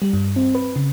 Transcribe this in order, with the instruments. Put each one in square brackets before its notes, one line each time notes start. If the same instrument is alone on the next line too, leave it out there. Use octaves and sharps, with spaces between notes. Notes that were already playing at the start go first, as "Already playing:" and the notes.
[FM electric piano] G3
G2
C4
B4
C#3